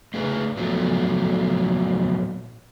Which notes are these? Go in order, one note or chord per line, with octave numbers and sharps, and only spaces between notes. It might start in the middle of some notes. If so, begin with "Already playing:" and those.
A3 G#4 B4
A#2 F3 F#3 A3 B3